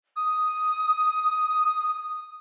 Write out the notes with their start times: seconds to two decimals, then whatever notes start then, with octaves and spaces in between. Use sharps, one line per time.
0.16 D#6
1.88 D#6